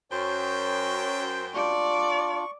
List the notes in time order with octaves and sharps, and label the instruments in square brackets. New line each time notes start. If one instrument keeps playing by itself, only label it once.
[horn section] F#2 G5 [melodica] C5 [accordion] C#5
[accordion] D4 F4 [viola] D5 [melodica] C#6